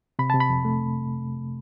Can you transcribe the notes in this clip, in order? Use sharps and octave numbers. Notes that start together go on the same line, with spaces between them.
C3 B5
C3 A5
B5
F2
A3